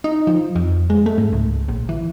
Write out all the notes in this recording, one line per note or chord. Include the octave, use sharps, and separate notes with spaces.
D#4
F3
F2
G#3
A3
G#2
C#2
A#1
E3